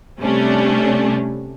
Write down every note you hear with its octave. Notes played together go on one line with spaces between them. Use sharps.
C3 G3 A3 C#4 D4